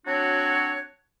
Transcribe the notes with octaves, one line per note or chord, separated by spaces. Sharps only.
F#3 C4 D4 F#4 C#5